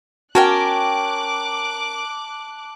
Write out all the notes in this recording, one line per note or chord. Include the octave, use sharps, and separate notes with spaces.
C#4 F#4 A#4 G5 A5 D6 F#6